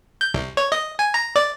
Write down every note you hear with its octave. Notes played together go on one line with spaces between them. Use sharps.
G6
C2
C#5
D#5
G#5
A#5
D5